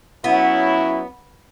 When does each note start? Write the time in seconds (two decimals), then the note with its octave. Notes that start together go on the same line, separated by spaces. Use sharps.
0.24 F#3 B3 C#4 E4